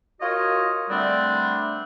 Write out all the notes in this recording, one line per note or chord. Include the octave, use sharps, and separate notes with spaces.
F4 F#4 A#4 C#5 D#5
D3 G3 A3 C4 D4